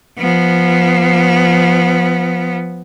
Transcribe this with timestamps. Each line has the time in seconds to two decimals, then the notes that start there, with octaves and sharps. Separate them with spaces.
0.18 F3 B3